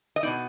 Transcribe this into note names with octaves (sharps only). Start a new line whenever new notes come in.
D#5
B2 B3 D#4 D5